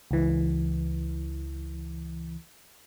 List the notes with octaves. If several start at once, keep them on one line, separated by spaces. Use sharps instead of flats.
C#2 E3